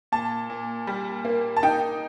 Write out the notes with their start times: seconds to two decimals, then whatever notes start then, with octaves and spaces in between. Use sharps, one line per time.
0.12 A#2 A5
0.50 A#2
0.87 G3
1.25 A#3
1.57 A5
1.63 D#4 G5